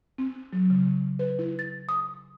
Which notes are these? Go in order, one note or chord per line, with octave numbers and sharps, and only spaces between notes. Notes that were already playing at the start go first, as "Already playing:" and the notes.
C4
F#3
C#3
B4
E4
A6
D#6